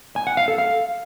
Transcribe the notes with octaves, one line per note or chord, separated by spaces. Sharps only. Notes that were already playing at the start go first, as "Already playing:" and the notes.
G#5
F#5
F5
A4
F5